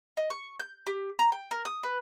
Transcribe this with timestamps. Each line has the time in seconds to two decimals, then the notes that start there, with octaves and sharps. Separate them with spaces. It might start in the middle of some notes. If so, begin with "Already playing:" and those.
0.17 D#5
0.30 C#6
0.60 G6
0.87 G4
1.19 A#5
1.32 G5
1.51 A#4
1.65 D#6
1.83 B4